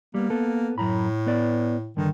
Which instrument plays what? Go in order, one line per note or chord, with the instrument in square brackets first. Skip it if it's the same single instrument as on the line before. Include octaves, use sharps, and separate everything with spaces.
[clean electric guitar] G3 B3 [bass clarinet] A#3
[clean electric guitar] B3 A4
[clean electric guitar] F#2 A#5 B5 [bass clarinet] A2
[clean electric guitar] B3 B4 D5
[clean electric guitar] G2 D3 [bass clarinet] D#3